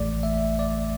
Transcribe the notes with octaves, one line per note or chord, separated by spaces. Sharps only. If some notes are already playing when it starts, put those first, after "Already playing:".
Already playing: A1 A2 E3 A3 D5
E5
D5